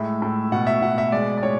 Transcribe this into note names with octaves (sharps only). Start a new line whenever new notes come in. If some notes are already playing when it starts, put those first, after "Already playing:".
Already playing: A2 G#3 E5
A2
B2 F#5
E5
B2 F#5
E5
G#3 D5
D5
A2 C#5